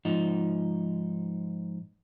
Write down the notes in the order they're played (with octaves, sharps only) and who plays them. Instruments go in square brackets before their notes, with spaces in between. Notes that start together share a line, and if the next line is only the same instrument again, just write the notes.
[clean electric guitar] G#2 F3 D#4